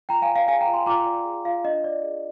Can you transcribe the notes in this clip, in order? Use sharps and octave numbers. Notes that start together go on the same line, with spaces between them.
F4 G5 A#5
F5 G#5
D5
F5
G#4 F5 G#5
G5 A#5
F4
G#5 C6
F4 A#5 D6
D5
G#4
F4 F5
D4 D#5
D5
G#4